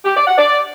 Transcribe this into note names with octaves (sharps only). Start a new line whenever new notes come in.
G4
D5
F#5
D5